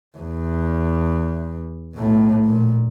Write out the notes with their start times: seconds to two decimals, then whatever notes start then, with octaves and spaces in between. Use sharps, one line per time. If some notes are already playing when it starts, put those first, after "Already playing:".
0.18 E2
1.95 B1 A2
2.45 A#1 A#2